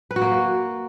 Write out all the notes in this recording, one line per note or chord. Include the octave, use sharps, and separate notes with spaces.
B4
F#4
A#3